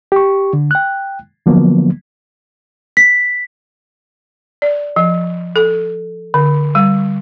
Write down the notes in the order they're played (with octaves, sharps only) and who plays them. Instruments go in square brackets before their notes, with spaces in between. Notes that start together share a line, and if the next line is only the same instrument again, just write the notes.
[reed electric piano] G4 C#6
D3
G5 F#6
D3 F3 F#3 A#3 B3
[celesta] B6
[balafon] D5
F3
A4
D3
G3